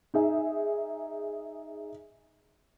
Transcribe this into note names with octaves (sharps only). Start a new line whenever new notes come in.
D#4 G#4 E5